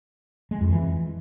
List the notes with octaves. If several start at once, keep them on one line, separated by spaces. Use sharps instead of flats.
G#3
F2
E3